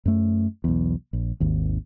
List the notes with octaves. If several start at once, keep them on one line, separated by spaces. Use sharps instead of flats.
F#2 A3
B1 E2
A#1
G#1 D#2